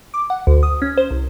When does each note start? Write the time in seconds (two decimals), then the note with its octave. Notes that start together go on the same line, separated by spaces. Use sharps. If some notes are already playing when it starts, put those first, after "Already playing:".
0.14 D6
0.30 F#5
0.47 D2
0.63 D#6
0.82 C#4
0.97 C5
1.11 C2